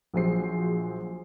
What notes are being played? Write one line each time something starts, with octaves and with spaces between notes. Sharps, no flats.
A#1 F3 F#3 G#4 C5 C7